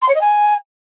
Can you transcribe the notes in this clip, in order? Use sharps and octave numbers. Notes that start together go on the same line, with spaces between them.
C6
C#5
D#5
G#5